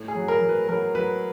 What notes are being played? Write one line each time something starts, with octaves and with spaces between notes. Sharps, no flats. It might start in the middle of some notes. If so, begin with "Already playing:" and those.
Already playing: A2
G#4
F#3
A#4
F#3
B4
F#3 A#4
F#3 B4